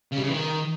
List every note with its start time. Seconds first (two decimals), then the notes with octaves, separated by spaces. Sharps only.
0.12 C#3
0.17 G3
0.23 C#3
0.28 E3
0.34 D#3